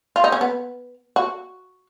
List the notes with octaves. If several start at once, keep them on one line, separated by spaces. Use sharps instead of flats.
F4
D#4
C#4
B3
F#4